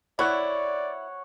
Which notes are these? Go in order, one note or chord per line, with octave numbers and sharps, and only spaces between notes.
E4 C#5 D5 F#5